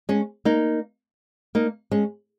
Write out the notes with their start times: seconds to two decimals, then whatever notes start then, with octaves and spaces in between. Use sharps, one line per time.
0.09 G#3 C#4
0.45 A#3 D#4
1.55 A#3 D#4
1.91 G#3 C#4